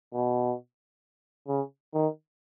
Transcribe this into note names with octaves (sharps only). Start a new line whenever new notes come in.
B2
C#3
D#3